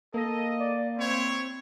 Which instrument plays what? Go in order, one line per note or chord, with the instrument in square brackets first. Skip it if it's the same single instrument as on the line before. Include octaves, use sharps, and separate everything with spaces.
[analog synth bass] A#3 [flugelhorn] A4 [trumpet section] D#5
[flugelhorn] D5
[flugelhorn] C4 [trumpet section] E4 C5 C#5